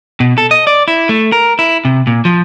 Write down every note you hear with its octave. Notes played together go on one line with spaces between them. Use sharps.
B2
A4
D#5
D5
E4
A3
A#4
E4
C3
A#2
F3